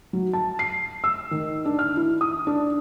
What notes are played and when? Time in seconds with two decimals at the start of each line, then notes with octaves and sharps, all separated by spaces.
0.13 F#3
0.33 A5
0.59 C7
1.04 E6
1.31 D#3
1.65 D4
1.79 F6
1.97 E4
2.21 D#6
2.47 D4